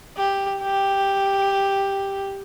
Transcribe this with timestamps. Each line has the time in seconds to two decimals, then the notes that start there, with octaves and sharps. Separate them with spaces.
0.17 G4
0.62 G4